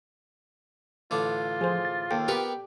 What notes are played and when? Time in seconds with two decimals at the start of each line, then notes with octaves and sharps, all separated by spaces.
1.11 A1 D3 D4 F4
1.61 F3 G#4 C5
1.85 A6
2.11 D#2 A4 G5
2.28 B3 G4 A#4 B4